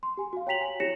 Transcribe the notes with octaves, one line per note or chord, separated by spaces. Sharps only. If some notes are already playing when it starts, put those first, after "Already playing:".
C6
G4 G#5
F#4 F5
C#5 G5 A#5 B6 F7 F#7
G#5
E4 G4 C#5 A#6 C#7 E7